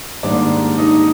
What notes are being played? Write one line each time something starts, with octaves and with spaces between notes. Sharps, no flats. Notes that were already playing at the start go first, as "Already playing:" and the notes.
G#2 D#3 G3 A#3 D4 D5
D#4 D#5